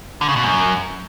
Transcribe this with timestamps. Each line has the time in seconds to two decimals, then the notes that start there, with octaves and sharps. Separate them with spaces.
0.21 D3
0.29 C#3
0.36 B2
0.44 F#2